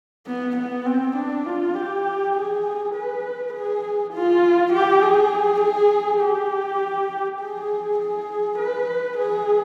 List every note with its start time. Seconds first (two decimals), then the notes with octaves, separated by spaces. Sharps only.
0.27 B3
0.56 B3
0.86 C4
1.17 D4
1.46 F4
1.75 G4
2.35 G#4
2.95 B4
3.54 G#4
4.13 F4
4.73 G4
5.02 G#4
5.61 G#4
6.21 G4
7.40 G#4
7.99 G#4
8.59 B4
9.18 G#4